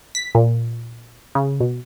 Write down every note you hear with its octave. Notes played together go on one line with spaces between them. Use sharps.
B6
A#2
C#3
B2